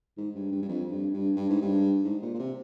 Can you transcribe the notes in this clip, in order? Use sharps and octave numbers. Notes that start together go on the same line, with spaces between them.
G#2
G2
G2
G2
F2
G2
G2
G2
G#2
G2
G#2
A#2
A#2
C3